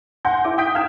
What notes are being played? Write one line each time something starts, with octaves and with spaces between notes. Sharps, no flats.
F#5 G#5 C6 G6 A#6
E4 E5 F#5 D6
G5 D#6 G6 B6 D7
F5 F6 G6 G#6 E7